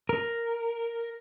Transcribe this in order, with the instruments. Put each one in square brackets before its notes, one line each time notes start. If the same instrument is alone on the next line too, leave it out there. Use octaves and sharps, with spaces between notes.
[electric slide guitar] A#4